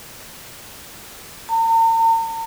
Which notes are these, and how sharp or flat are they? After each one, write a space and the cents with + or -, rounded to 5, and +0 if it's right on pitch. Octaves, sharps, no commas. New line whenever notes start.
A#5 -45